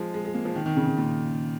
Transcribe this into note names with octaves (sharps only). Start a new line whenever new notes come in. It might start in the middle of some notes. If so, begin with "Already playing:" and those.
Already playing: F3 G#3
G#3
G#3
A#3
F3
D#3
D#3
C#3
C#3
A#2